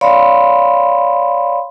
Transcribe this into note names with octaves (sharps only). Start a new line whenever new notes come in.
C#5 D5 F5 B5 C6